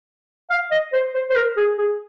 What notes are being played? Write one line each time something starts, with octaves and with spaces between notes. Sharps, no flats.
F5
D#5
C5
C5
C5
A#4
G#4
G#4